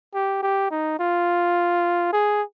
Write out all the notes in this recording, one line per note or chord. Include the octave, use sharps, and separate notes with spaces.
G4
G4
D#4
F4
G#4